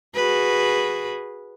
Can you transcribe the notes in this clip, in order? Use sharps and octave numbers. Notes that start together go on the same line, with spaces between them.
F#4 G#4 B4